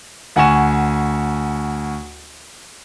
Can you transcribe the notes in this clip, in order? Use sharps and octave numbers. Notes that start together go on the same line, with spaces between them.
D2 F#5 G#5 C#6 E7